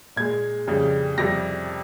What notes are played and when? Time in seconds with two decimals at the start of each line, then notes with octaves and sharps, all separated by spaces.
0.16 A#2 G#3 G#6
0.67 F2 C#3 G3
1.18 F2 C3 G3 A#6